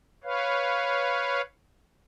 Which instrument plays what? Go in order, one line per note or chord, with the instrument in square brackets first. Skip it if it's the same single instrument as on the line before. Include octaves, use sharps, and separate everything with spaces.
[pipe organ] B4 C#5 F5